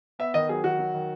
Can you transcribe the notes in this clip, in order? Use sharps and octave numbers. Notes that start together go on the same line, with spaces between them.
B3 E5
D#3 D#5
F#3 G#4
D#3 F#4
F#3
D#3